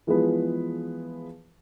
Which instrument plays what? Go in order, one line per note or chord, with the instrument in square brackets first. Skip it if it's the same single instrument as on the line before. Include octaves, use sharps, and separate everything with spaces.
[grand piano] E3 F3 G#3 B3 G#4 B4